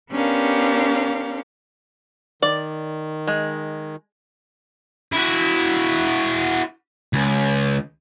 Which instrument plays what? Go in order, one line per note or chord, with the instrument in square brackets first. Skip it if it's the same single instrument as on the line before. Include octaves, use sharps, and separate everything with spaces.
[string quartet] B3 C#4 D4 G4 A#4 F5
[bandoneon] D#3 [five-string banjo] D5
[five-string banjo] G#3
[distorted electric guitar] E4 F#4
C#2